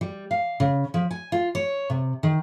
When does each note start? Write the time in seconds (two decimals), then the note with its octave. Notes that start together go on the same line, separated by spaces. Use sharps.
0.01 G3
0.31 F5
0.60 C#3
0.94 F3
1.11 G#5
1.32 F4
1.55 C#5
1.90 C3
2.23 D#3